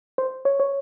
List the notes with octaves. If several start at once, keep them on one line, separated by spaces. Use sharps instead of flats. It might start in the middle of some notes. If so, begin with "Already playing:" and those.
C5
C#5
C#5